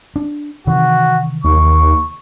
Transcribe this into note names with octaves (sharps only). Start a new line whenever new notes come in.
D4
C3 D#3 E3 F#4
D#2 C#6